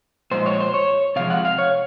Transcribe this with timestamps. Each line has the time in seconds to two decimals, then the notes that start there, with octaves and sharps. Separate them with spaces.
0.31 A#2 F3 G#3 C5
0.46 C#5
0.60 C5
0.74 C#5
1.16 C3 F3 G#3 F5
1.30 F#5
1.45 F5
1.58 C#5